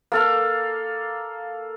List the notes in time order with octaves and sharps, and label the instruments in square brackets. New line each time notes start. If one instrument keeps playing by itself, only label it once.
[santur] A#3 A4 F5